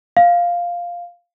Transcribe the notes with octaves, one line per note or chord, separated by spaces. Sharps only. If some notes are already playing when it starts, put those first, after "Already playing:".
F5